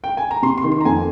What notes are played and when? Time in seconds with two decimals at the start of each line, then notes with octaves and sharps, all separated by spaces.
0.04 G5
0.17 G#5
0.31 A#5
0.43 C3 C6
0.58 C6
0.64 D#3
0.72 C6
0.81 A#5
0.85 F2 G#5